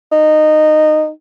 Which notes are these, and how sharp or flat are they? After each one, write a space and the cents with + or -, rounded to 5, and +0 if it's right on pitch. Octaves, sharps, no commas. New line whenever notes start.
D#4 -15